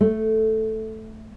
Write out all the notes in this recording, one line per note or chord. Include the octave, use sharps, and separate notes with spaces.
A3